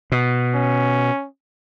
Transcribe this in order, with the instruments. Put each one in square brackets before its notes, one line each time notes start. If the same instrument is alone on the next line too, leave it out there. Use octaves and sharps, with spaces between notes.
[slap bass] B2
[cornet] C#4